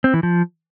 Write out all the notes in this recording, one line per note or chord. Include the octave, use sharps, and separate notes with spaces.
C4
E3
F3